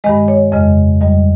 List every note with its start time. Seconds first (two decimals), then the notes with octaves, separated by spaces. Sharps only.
0.04 G2 D#3 G#3 D#5
0.28 C#5
0.52 F2 C#3 G#3 D#5
1.01 F2 D#3 G3 D#5